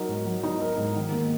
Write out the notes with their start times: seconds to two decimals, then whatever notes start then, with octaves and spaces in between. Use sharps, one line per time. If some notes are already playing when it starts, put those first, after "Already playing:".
Already playing: F#3 D#4 A#4
0.09 G#2
0.26 F#3
0.44 D#4
0.61 A#4
0.77 G#2
0.96 D#3
1.12 A#3